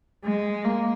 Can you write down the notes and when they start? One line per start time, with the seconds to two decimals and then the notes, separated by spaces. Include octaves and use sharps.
0.24 G#3
0.65 A#3